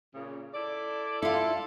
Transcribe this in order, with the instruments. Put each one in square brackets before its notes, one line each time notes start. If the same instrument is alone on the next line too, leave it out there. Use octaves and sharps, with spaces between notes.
[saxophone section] A#2 C#3
E4 A4 D5
[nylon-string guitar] E4 F5 [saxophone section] F4 A4